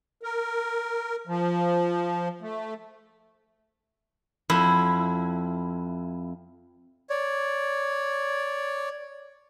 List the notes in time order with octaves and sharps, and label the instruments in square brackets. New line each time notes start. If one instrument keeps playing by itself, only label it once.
[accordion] A#4
F3
A3
[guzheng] F2 E4
[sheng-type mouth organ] C#5 D5